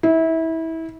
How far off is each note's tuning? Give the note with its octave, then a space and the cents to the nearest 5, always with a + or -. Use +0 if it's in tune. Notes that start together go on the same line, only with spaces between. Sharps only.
E4 -25